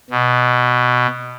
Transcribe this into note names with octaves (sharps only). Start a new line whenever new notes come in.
B2